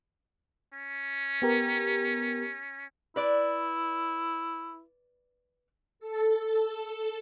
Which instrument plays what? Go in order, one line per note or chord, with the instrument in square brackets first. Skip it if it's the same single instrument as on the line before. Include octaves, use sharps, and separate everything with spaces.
[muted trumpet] C#4
[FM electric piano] B3 G4 A#4
[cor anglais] E4 [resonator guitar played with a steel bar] B4 D5
[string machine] A4